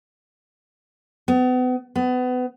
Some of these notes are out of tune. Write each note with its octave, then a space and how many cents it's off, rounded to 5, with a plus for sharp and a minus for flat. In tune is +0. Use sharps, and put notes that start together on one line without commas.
B3 +35
B3 +30